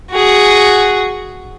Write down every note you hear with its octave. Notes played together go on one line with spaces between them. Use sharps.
F#4 G#4